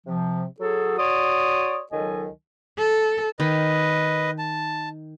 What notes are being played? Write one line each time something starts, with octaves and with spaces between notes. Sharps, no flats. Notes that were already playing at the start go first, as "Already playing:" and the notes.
C3 F3
F#3 G#4 A4
F#4 C#5 D5 C6 D#6
C#2 D#3 F#3 A4 D#5 G#5
A4
D#3 B4 D#5
A5